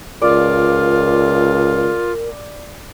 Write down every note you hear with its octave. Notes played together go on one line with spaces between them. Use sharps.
C#2 F4 A#4 D5